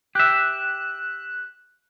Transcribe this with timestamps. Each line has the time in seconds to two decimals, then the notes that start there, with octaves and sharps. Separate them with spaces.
0.15 G4 E5 F#6